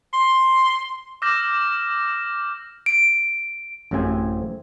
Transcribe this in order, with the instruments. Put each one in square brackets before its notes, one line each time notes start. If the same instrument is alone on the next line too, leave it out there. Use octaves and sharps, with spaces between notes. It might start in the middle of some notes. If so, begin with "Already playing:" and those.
[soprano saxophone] C6
[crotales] D6 E6 F6 G6 A#6 E7
[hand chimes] D7
[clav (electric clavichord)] A1 F#2 A2 C3 C4 G#5